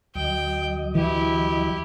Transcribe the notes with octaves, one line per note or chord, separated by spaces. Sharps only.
D2 F#3 D#5 G5
E3 E4 G4